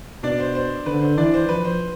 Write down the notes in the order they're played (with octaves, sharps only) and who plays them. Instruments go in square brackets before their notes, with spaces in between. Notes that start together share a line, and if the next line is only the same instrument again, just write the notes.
[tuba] B2 [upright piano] D4 D5
[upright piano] C5
C5
[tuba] D3 [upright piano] B4
[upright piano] C5
[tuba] E3 [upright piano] D4 D5
[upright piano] C5
[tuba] F3 [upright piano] B4
[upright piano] C5